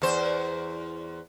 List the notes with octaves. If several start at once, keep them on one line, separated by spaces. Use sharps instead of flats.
E2 C5